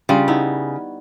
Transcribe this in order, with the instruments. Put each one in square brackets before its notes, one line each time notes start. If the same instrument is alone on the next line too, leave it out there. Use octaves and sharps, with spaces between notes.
[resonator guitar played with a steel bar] C#3 [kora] G3 F4
[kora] B3 D#4 E4